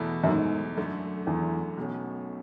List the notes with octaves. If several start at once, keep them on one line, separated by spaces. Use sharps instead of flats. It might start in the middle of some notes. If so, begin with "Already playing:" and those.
Already playing: E2 B2 A3 E4
F#2
G#2
F#2 D3 A3
E2
B1 B2 A3 C#4